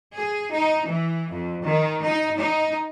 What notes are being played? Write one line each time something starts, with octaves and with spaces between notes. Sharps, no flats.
G#4
D#4
E3
F2
D#3
D#4
D#4